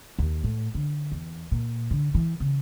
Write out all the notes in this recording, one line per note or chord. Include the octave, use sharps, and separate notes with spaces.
D#2
A2
D3
E2
A#2
D3
E3
C#3